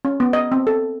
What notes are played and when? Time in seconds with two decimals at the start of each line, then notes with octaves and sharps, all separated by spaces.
0.05 C#4
0.20 B3
0.33 D#5
0.52 C4
0.67 A4